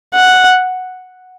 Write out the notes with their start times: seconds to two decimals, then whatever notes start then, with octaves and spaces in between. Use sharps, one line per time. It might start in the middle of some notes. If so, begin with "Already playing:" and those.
0.14 F#5